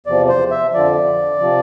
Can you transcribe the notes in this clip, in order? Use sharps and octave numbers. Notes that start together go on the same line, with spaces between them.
E2 C3 F3 D5
C5
E5
F2 D3 F3 D5
C3 F3